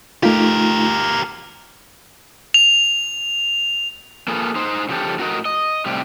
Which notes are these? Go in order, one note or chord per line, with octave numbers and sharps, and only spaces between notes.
A3 D#4 F4 G4 A#4
F7
A#3 F4 G#4 A4 B4
D#4 C5
C#3 F3 D4 G4 A4
A2 F#4 A#4 D#5
D#5
A2 C3 G3 G4